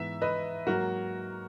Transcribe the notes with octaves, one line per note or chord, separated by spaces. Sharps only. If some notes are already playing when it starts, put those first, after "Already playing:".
Already playing: G#2 E3 B3 E5
B4 D#5
G#2 F#3 A#3 F#4 A#4